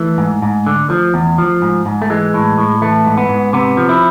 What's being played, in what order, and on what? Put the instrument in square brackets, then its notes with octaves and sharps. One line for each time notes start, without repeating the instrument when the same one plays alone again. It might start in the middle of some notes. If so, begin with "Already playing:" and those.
Already playing: [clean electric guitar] E3 A3
G#2
G#2
D3
F3
E2
F3
G#2
G#2
A3
E3 G#3
A2
A2
E3 A3
G#2
B3
G#2
C3 B3
F3
E4